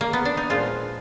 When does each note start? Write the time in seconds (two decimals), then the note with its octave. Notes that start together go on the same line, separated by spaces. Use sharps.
0.01 A#3
0.13 B3
0.25 D4
0.37 D#4
0.50 A#2 F3 G#3 F4